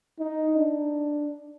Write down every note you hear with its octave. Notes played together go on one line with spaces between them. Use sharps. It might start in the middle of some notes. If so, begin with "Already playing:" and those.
D#4
D4